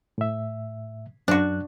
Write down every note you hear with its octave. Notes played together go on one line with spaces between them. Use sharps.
A2 E5
F#2 D4 F#4 F#6